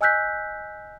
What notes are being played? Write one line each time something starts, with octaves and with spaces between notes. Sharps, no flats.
D#5 G#5 E6 F#6 G6 B6